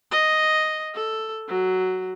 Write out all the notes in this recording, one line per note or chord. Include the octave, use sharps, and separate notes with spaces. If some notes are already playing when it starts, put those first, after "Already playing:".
D#5
A4
F#3